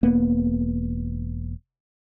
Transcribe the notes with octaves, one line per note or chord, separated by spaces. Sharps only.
E1 A#3 B3